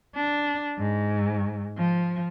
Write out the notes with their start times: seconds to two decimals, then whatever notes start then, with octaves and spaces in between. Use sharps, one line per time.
0.15 D4
0.78 G#2
1.77 F3